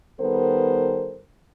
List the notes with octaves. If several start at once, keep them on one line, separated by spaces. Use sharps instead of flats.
D#3 G3 B3 A4 A#4 C5